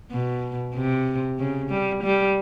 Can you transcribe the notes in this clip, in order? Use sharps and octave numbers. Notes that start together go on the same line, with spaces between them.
B2
C3
C#3
G3
G3